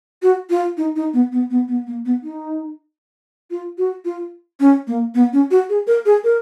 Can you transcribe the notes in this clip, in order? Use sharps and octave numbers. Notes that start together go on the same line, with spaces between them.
F#4
F4
D#4
D#4
B3
B3
B3
B3
A#3
B3
D#4
F4
F#4
F4
C#4
A#3
B3
C#4
F#4
G#4
A#4
G#4
A#4